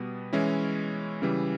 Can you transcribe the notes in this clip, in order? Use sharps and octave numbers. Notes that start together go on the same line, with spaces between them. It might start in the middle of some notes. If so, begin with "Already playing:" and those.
Already playing: B2 G3 B3
E3 G#3 C#4 E4
C#3 E3 G3